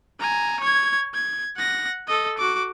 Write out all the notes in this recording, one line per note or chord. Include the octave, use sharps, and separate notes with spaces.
G#5 A#5
C#5 G#6
G#6
F#5 A#6
A4 D#5
F#4 D6